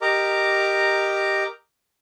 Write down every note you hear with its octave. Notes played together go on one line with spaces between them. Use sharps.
G4 A#4 D#5 A#5 D6